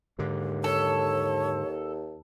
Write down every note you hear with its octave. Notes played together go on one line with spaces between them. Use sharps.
D#2 G#2 D3
A4 C#5